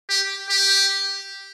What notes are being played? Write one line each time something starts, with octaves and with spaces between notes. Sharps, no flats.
G4
G4